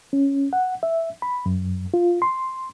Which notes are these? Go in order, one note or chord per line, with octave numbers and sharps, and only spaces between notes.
C#4
F#5
E5
B5
F#2
F4
C6